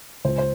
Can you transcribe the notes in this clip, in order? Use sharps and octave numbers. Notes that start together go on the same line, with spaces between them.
C#2 C5
C5